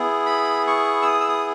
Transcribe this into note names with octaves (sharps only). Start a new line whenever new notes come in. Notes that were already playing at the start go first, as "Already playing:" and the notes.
Already playing: B3 E4 G#4
B5
C#6
E6
D#6
E6
D#6